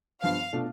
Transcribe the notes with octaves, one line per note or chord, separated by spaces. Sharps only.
G2 F3 B3 F5
B2 A3 D4 F4